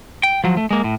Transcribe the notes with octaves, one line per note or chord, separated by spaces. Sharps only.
G5
F3 F#3
A3
G#3 A#3
A2